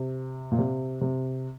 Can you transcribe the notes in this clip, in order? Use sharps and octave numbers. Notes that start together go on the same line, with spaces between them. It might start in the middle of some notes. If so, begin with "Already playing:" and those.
Already playing: C3
A#2
C3
C3